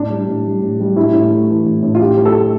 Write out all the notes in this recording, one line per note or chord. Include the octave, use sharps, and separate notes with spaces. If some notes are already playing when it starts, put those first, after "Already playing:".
Already playing: A2 D4
G3
A2
G3
A2
G3
A2 E4
A2
A3
E3
A2
A2
F4
A2 G4
A2
A4
A3